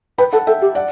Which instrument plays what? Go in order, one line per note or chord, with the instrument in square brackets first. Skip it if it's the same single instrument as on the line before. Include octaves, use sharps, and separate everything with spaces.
[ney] B4 [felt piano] G5 B5
[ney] A4 [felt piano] F#5 A5
[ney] A4 [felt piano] E5 G5
[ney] G4
[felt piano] D5 F#5